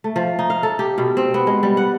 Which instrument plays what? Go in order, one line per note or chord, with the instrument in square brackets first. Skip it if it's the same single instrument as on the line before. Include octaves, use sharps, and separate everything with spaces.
[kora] A3
F3
D#4
F5
A4
G4
B2
C4
B3
G#3
G3
F#5